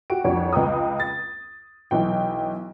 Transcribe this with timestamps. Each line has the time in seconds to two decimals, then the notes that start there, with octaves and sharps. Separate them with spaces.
0.10 F#4 G4 D7
0.24 C2 F2 D4 F#4 C#5
0.53 C#2 B4 G5 A#5 D#6
1.00 A6
1.91 B1 E3 G5